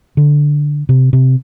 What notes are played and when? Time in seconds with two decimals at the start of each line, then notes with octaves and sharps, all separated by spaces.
0.17 D3
0.89 C3
1.13 C3